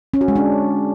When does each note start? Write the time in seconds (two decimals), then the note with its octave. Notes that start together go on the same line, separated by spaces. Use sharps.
0.14 C#4
0.21 F#4
0.28 G#3
0.36 D4